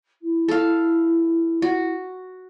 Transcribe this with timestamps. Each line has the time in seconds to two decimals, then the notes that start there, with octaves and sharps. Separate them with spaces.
0.22 E4
0.48 A4 F5
1.62 F#4